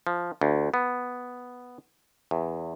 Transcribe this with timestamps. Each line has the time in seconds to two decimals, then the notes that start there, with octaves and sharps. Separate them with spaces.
0.07 F3
0.41 D2
0.74 B3
2.31 E2